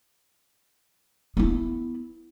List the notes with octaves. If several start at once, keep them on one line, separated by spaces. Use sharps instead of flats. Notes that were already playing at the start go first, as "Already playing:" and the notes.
B3 E4